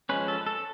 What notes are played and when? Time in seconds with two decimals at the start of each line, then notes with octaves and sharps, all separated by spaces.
0.09 F3 G#3 C#4 B4
0.28 A4
0.46 A4